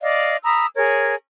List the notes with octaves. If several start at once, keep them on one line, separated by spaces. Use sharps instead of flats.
D5 D#5 F5
A#5 B5 D#6 E6
G#4 A#4 C#5